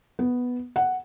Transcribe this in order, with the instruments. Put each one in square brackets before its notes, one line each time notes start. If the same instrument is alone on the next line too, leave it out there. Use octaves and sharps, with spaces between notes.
[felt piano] B3
F#5